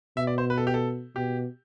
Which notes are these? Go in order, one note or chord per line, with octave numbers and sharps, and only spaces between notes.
B2 E5
D5
C5
B4
A4
G4
A4
B2 G4